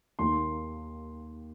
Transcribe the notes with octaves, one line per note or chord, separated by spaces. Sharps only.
D#2 D#3 A#3 C6